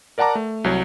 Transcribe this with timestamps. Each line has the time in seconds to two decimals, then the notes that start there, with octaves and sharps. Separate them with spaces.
0.18 A#4 D5 F#5 A5 A#5 D6
0.35 A3
0.64 C2 F#3 C#5